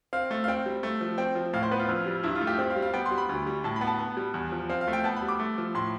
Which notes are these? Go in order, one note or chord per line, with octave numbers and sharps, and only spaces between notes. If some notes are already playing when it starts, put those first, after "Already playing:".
C4 F5
A3
F5
C4 G5
G3
A3
F3
C4 G5
F3
A2 F5
C5
B3 B4
F4
F2
G3
G2 E4
F4
A3
G4
C4 G4
F5
G3
F5
B3 G5
C6
G3
B5
D2
G3
A2 A5
B5
B3
A5
B3
G3
E2
F3
C4 F5
F5
A3
G5
B3 A5
B5
G3
D6
A3
F3
A2 C6